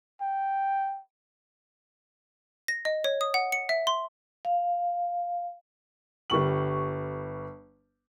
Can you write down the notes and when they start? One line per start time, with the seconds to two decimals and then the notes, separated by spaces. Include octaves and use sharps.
0.21 G5
2.68 A#6
2.85 D#5
3.04 C#5
3.21 D#6
3.34 F#5
3.52 C#7
3.69 E5
3.87 C6
4.45 F5
6.30 G1 G3 C#6 F#7